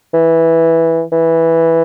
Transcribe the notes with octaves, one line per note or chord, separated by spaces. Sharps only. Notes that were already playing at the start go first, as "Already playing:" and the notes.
E3
E3